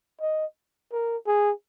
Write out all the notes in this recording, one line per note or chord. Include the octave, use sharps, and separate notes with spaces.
D#5
A#4
G#4